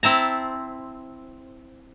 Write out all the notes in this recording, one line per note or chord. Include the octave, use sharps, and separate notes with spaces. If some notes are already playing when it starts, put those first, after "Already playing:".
C4 E4 A5 A#5